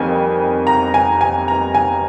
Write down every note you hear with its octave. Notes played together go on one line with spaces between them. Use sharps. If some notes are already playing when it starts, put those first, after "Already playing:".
Already playing: F2 D#3 G3 A#3 G#5
A#5
G#5
G#5
A#5
G#5